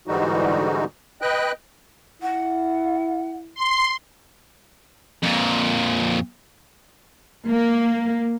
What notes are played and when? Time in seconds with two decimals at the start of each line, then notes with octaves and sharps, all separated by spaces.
0.07 G#2 D3 E3 G3 D#4 F#4
1.22 B4 D#5 G5 F#6
2.22 E4 F#5
3.55 C6
5.23 F2 A#2
7.49 A#3